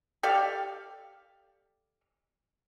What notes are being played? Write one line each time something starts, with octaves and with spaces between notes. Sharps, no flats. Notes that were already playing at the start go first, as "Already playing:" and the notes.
G4 A4 D5 F5